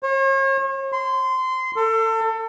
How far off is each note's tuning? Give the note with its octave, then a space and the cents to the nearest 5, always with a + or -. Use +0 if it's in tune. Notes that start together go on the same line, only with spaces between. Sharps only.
C#5 -45
C6 -20
A4 +30